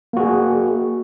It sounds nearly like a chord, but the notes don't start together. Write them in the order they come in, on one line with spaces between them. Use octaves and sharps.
A#3 F#4 G#4